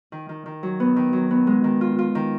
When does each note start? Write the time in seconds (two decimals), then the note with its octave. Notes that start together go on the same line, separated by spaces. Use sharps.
0.12 D#3
0.29 D#3
0.46 D#3
0.63 F#3
0.80 B3
0.96 D#3
1.13 F#3
1.31 B3
1.47 G#3
1.64 D#3
1.81 F4
1.99 F4
2.15 D#3